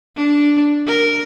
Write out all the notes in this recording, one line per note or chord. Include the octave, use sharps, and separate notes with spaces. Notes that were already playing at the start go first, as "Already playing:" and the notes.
D4
A#4